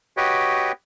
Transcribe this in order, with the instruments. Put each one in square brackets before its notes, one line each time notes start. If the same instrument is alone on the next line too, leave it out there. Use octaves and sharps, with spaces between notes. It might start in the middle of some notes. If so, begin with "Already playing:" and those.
[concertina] F#4 G4 B4 C#5 D#5 G5